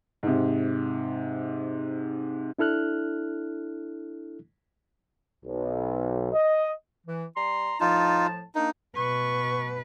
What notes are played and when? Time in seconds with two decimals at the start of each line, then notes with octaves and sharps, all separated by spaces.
0.23 G#2 C3
2.59 D4 E4 A4 F6 F#6
5.44 B1
6.33 D#5
7.06 E3
7.36 G3 A#5 C6
7.80 A2 F3 D#4 F4 A5
8.55 A#3 D4 D#4
8.96 B2 B4 C#6